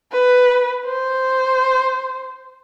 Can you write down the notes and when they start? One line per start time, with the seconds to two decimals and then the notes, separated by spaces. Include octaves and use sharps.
0.12 B4
0.85 C5